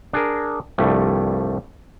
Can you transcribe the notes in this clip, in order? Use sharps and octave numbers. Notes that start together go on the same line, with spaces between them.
D4 G#4 A#4
C2 G2 F3 G3 A3